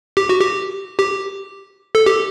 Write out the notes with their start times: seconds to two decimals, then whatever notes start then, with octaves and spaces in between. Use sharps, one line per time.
0.17 G4
0.29 F#4
0.41 G4
0.99 G4
1.95 A4
2.06 G4